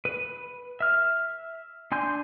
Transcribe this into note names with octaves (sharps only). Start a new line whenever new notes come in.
B4
E5 F6
D4 G#5 C6 G6